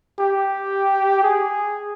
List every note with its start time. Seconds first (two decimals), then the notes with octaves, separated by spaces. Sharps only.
0.19 G4
1.23 G#4